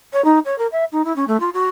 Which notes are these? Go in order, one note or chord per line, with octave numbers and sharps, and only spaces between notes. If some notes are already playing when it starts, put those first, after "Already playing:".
C#5
D#4
C#5
A#4
E5
D#4
E4
C#4
A3
F4
F#4